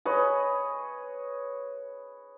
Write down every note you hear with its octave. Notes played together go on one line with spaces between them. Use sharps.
G#4 B4 C#5 D#5